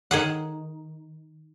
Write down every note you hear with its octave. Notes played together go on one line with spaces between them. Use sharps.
D#3 G#4 F#5